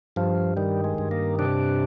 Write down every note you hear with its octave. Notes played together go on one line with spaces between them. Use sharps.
G2 F3
D#3 G3
G#3
G2
A#3
C3 D4